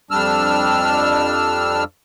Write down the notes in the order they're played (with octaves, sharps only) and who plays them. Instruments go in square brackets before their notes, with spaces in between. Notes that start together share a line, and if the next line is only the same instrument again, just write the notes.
[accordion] F2 G3 D4 E6 F6